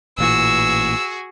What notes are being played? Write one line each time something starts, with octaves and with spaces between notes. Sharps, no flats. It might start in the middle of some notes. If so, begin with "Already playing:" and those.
A1 A#2 E3 F#4 G#4 E6